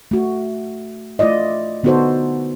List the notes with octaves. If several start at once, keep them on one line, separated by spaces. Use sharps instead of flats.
A3 F#4
A3 E4 F4 D5 D#5
D3 B3 D#4 F#4 A4 C5